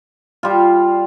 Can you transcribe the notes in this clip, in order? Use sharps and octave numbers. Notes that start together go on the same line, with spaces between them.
G3 F4